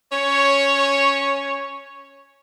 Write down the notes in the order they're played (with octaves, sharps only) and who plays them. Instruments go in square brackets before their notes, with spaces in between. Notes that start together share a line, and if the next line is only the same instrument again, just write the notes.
[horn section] C#4 C#5